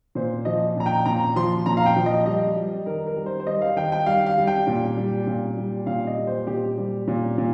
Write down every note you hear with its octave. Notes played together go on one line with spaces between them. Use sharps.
A#2 C5
F3 D#5
A#2 A#5
G5
A#2 A#5
F3 C6
A#2 A#5
F5
G5
F3
D#5
G3 D#5
G3
D#3 A#4
A#4
G3
C5
C5
G3 D#5
F5
D#3 G5
G5
G3 F5
F5
G3
G5
A#2
G3
A#2
G3
A#2 F5
D#5
G3
C5
A#2 G4
G3
A#2
A#2